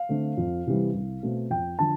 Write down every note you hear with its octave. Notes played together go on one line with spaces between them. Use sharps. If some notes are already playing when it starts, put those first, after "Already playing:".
Already playing: F5
D3 A3 C4
F2
C3 E3 G3
C2
B2 A3 C4
F2 G5
D3 F3 A5